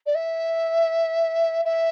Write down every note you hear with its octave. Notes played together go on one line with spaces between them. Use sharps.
D5
E5
E5